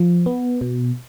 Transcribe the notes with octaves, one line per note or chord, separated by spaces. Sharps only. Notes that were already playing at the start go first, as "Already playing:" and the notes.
Already playing: F3
B3
B2